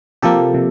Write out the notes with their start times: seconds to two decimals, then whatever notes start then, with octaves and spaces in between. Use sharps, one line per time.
0.22 C3 F3 A#3 G4 A4
0.54 C3